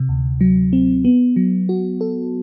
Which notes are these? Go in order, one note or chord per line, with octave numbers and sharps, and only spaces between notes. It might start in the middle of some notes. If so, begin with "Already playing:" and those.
Already playing: C3
D2
F#3
C4
B3
F#3
F#4
A4